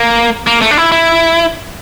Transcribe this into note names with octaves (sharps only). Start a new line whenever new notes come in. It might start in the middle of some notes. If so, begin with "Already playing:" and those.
Already playing: A#3
A#3
A3
D4
E4
E4